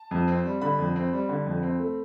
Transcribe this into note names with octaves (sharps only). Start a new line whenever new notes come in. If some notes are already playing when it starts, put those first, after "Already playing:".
Already playing: A5
F2
C4
G3
D3 B5
F2
C4
G3
D3
F2
C4
A3